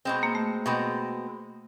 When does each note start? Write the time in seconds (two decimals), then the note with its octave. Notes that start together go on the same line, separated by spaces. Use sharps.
0.05 B2 G#3 C4
0.23 A#3
0.35 A3
0.66 B2 G#3 C4